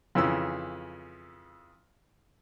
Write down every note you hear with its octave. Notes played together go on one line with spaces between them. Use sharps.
F2 C#3 E3 E6